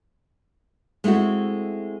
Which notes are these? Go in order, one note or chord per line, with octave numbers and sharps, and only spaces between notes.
G#3 A3 C4 E4 F#4